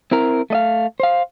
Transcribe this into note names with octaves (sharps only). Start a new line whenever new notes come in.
C4 E4 A#4
A3 D#5 F5
C5 F5